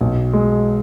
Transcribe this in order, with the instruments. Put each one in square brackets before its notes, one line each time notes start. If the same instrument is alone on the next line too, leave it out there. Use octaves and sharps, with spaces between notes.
[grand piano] B1
G#3